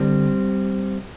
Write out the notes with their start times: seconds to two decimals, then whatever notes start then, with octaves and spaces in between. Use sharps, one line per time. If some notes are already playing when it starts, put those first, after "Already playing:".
Already playing: D3 G3 C4